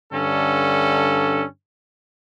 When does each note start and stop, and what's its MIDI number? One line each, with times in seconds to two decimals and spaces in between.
0.12 1.45 43
0.12 1.45 50
0.12 1.45 61
0.12 1.45 69